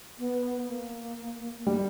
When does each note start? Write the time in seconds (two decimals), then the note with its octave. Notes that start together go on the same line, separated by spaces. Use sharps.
0.19 B3
0.68 A#3
1.67 G3